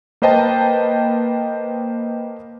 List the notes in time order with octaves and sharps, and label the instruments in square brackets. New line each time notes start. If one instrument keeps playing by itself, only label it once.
[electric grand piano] A#3 B4 C5 D#5 G5 A5